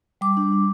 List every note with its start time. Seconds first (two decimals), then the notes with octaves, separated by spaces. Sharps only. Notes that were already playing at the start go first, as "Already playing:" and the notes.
0.21 G3 D6
0.37 D4
0.52 D4